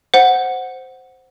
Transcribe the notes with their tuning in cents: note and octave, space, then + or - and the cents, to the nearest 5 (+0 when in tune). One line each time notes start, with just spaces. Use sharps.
C5 +0 F#5 +0